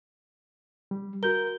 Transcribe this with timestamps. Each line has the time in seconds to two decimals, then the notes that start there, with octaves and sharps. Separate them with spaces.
0.91 G3
1.23 F#4 A#4 G6 G7